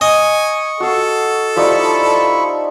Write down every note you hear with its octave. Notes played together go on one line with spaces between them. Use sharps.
D#5 G#5 C#6
F#4 A4 F5
F3 G3 D#4 E4 B5 C#6